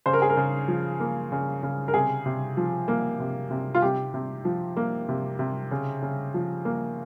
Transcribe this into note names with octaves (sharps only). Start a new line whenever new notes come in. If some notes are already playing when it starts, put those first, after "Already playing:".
C#3 C5
A#4
G#4
A#4
C#3
F3
A#3
C#3
C#3
A#4
C3 G#4
C3
F3
A#3
C3
C3
F4
C3 G4
C3
F3
A#3
C3
C3
C#3
C#3
F3
A#3